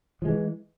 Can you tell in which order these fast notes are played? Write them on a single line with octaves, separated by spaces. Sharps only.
F3 G#3 E3